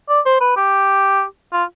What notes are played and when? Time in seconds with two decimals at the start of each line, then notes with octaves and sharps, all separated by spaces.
0.09 D5
0.26 C5
0.41 B4
0.57 G4
1.53 F4